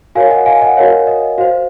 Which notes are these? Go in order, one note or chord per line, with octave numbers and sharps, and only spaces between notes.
F#4 A#4 C#5 F5 G#5
D#5 F#5
F5 G#5
D#5 F#5
F#4 A#4 C#5 F5
D#5
F#4 C5 F5